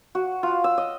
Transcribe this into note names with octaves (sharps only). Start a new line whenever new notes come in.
F#4
F4
E6
D#5